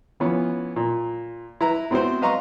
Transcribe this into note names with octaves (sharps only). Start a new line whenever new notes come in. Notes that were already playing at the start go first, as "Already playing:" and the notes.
E3 F3 B3 C#4
A#2
E4 B4 A#5
B3 C4 E4 F#4 C5
B4 D#5 F5 A#5 C6 C#6